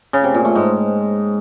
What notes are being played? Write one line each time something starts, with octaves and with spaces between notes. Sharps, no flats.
C#3
C3
A#2
A3
G#2